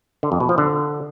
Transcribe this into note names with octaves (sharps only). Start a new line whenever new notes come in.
D3
F2
B2
F3
D3